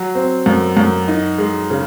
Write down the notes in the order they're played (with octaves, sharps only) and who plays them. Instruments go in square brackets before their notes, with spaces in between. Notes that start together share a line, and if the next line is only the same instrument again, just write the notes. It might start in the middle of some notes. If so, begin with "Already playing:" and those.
Already playing: [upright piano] F#3
C4
F#2
F#2
D#4
G#3
C#3